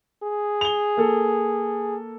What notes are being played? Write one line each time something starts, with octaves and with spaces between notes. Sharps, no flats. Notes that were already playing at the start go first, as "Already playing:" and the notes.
G#4
F7 G7
A#3 A4